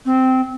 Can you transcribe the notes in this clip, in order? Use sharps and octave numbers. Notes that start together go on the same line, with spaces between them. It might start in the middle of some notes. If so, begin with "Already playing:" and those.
C4